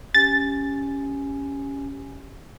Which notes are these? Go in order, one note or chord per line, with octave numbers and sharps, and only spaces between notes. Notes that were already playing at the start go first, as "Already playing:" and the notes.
C#4 G4 G#5 A6